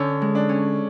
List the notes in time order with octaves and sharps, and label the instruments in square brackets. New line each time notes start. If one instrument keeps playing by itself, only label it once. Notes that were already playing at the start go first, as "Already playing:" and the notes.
Already playing: [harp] D3 [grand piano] C#4
[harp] G#3
[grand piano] D4
[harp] C#4